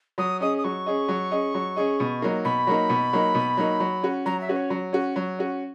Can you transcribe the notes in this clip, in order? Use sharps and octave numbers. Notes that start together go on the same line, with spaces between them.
F#3 D#6
C#4 G#4 D#5 D#6
D#6
F#3 C#6
C#4 G#4 D#5
F#3
C#4 G#4 D#5
F#3
C#4 G#4 D#5
B2
F#3 A#3 D#4
B2 B5
F#3 A#3 D#4
B2
F#3 A#3 D#4
B2
F#3 A#3 D#4
F#3
C#4 F#4
F#3 A#5
E5
C#4 F#4 B4
C#5
F#3
C#4 F#4
F#3
C#4 F#4